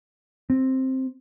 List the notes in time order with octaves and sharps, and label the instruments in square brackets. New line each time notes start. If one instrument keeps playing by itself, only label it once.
[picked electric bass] C4